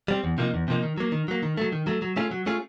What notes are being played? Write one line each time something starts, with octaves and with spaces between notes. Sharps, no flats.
G3 C4
E2
C3 F3 A#3 D#4
E2
C3 F3 A#3 D#4
D#3
F#3 A#3
D#3
F#3 A#3
D#3
F#3 A3
D#3
F#3 A3
F#3
A3 C#4 F4 G#4
F#3
A3 C#4 F4 G#4